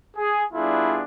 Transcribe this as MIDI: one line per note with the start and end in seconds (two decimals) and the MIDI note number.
0.16 0.44 68
0.53 1.02 55
0.53 1.02 59
0.53 1.02 62
0.53 1.02 64
0.53 1.02 65
0.53 1.02 68